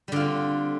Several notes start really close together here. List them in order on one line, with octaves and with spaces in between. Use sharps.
G3 D3 F4 C4